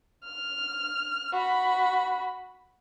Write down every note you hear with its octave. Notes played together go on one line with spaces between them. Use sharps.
F6
F#4 B5